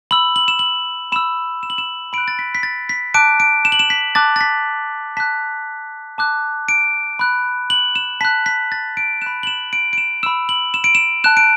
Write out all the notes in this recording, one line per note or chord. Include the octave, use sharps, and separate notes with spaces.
B5 E6 F#7
F#7
E7
F#7
B5 E6 E7
E7
F#7
E7
B5 F#6 D7
A6
B6
B6
A6
B6
A5 D6 F#6 D7
D7
E7
F#7
E7
B6
A5 D6 F#6 A6
A6
B6
A5 F#6 B6
A5 D6 F#6
D7
B5 F#6
F#7
E7
A5 F#6 B6
B6
A6
D7
B5 F#6 E7
F#7
E7
D7
D7
E7
B5 E6 E7
F#7
E7
D7
E7
A5 F#6 E7
D7